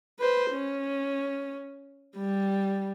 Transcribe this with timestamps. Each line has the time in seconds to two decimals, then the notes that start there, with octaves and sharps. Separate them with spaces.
0.19 B4 C5
0.51 C#4
2.18 G3